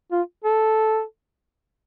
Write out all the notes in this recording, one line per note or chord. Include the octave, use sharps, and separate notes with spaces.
F4
A4